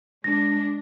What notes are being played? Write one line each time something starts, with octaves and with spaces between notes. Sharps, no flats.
G#3 D4 A#6